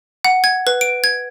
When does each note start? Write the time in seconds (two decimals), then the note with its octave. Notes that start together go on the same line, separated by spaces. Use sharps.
0.25 F#5
0.44 G#6
0.67 B4
0.81 D7
1.04 G#6